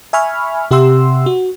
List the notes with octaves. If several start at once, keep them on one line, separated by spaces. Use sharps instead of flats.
E5 G#5 B5 C#6 F6
C3 G4 E5 F#5 C6 E6
F#4